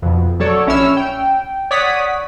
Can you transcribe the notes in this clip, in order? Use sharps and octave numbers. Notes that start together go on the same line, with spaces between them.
F2 B2
F#3 A4 C#5 D5
A#1 C#4 E4 C#5 E6 F6
G5
C#5 D5 F#5 D#6 B6